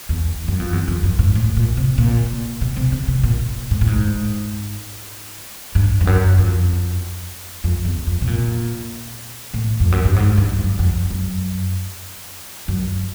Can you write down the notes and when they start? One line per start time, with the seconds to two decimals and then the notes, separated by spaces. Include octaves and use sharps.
0.09 E2
0.48 F#2
0.60 F2
0.73 E2
0.88 F2
1.03 F#2
1.19 G#2
1.35 A2
1.57 A#2
1.77 C3
1.98 A#2
2.61 B2
2.77 C3
2.92 C#3
3.08 C3
3.23 A#2
3.71 G#2
3.81 A2
3.87 G#2
5.75 G2
6.01 F2
6.07 F#2
6.38 F2
7.64 F2
7.85 E2
8.07 F2
8.21 B2
8.27 A#2
9.54 A2
9.80 F2
9.92 F#2
10.05 G2
10.16 G#2
10.37 G2
10.58 F#2
10.79 F2
11.10 F#2
12.68 F#2